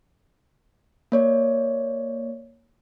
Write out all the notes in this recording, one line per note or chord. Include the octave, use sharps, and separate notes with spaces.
A#3 C#5 D5